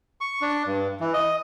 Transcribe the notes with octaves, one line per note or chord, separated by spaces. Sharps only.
C#6
D4
G2
E3
D#5